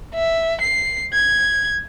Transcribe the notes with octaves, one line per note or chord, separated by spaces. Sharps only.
E5
C7
G#6